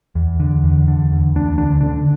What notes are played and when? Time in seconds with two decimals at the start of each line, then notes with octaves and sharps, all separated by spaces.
0.15 E2
0.40 D3
0.64 E2
0.88 D3
1.11 E2
1.35 D2 D4
1.58 D3 D4
1.81 D3 D4